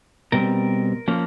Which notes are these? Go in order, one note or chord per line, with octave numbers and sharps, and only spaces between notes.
B2 G3 C4 A#4
F3 A#3 C#4